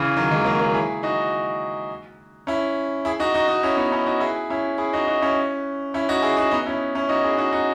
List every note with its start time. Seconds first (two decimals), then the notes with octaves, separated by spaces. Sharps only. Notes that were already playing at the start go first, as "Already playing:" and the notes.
Already playing: C#3 E3
0.17 D#3 F#3
0.31 E3 G#3
0.45 F#3 A#3
0.60 F#3 A#3
0.74 E4 G#4
1.03 D#4 F#4
2.47 C#4 E4
3.05 E4 G#4
3.20 D#4 F#4
3.34 D#4 F#4
3.48 D#4 F#4
3.63 C#4 E4
3.77 B3 D#4
3.92 C#4 E4
4.06 D#4 F#4
4.20 E4 G#4
4.50 C#4 E4
4.78 E4 G#4
4.93 D#4 F#4
5.07 D#4 F#4
5.22 C#4 E4
5.94 C#4 E4
6.09 D#4 F#4
6.22 E4 G#4
6.37 D#4 F#4
6.51 B3 D#4
6.66 C#4 E4
6.95 C#4 E4
7.09 D#4 F#4
7.24 E4 G#4
7.38 D#4 F#4
7.53 D#4 F#4